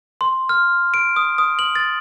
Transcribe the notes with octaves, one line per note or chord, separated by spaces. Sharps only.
C6
F6
D7
D#6
D#6
F#7
A6